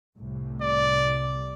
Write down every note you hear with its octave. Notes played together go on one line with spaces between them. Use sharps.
C2 A2 C3
D5